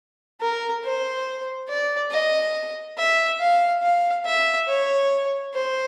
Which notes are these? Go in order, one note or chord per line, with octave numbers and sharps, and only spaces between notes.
A#4
C5
D5
D#5
E5
F5
F5
E5
C#5
C5